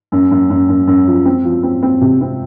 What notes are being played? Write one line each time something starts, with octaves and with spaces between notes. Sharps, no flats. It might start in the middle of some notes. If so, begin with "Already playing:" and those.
F#2
F#2
F#2
F#2
F#2
F3
C4
F3
C4
C4
C3
C4